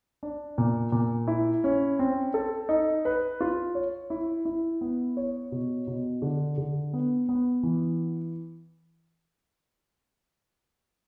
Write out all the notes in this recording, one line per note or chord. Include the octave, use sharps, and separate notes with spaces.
D4
A#2
A#2
E4
C#4
C4
A4
D#4
B4
F4
C#5
E4
E4
B3
C#5
B2
B2
D3
D3
B3
B3
E3